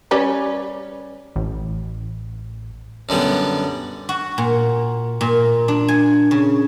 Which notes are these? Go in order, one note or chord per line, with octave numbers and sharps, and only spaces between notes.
G3 C#4 B4
A1
F#2 D3 G3 B3
F#4
A#2
A#2
D4
G#5
C#3